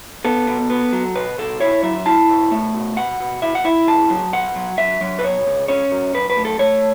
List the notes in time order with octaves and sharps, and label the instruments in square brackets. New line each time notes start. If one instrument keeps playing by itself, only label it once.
[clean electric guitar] B3 A4
B2
B3
F#3
B2 B4
B2 A4
E4 C#5
F#3 E5
E4 A5
B2
A3
B2
B2 F#5
B2
E4 E5
F#5
E4 E5
C#2 A5
F#3
B2 F#5
F#3
F#3 E5
F#3
B4
B2 C#5
C#2
C#4 C#5
F#2
F#2 B4
B4
A3
A4
A3 C#5